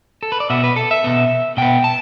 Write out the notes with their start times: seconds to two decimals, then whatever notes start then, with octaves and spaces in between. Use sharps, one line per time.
0.23 A4
0.32 B4
0.40 D5
0.50 B2 B3 E5
0.64 B4
0.76 A4
0.91 E5
1.04 B2 B3
1.57 B2 B3 G5
1.84 A5